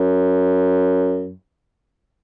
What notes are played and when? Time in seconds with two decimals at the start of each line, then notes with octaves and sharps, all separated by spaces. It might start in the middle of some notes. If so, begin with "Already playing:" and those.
Already playing: F#2